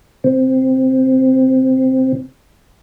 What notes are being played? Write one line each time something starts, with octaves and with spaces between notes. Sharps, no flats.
C3 C4